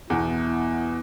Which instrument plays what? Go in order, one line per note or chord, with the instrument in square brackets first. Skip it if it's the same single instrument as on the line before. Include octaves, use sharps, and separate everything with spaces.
[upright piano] E2 B2 [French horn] E4